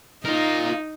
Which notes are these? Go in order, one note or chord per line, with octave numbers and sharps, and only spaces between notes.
D#4 F4 A#4